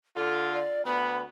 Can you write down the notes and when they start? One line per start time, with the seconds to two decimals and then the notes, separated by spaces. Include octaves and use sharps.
0.16 D3 F4 A4
0.54 D5
0.85 D2 B3 B5